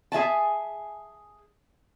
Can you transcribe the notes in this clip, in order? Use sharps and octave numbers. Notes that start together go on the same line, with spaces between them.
G#4 E5 G#5 A5